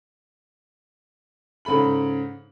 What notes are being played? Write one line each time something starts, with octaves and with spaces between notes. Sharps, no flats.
G#2 C#3 A4 B5 F#7